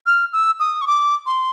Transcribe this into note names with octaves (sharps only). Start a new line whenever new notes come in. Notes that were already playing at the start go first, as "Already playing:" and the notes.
F6
E6
D#6
C#6
D6
C6